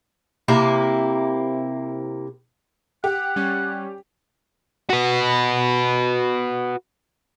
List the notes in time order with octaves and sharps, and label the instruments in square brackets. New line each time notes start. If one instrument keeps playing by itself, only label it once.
[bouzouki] C3 A#3 E4
[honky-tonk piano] G4 [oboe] F#5
[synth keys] G3 C#4
[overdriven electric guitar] F#4 B4